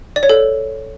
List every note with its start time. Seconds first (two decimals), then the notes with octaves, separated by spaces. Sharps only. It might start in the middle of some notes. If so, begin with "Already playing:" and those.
0.16 D5
0.23 C#5
0.29 A4